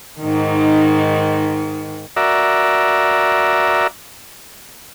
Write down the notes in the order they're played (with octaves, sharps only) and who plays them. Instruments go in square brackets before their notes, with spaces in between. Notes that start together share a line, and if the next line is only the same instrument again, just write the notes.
[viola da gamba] G#2 D#3
[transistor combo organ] F#4 A#4 D5 E5